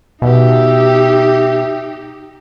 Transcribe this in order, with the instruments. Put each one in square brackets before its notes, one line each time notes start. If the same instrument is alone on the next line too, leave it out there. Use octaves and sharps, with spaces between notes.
[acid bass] B2 [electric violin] D#4 G4 [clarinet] E5